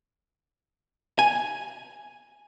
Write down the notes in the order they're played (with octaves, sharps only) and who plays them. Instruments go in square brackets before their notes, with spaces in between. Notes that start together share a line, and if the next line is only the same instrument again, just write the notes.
[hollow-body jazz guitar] G#5